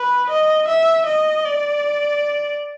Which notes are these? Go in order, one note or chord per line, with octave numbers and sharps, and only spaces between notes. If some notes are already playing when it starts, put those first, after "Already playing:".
Already playing: B4
D#5
E5
D#5
D5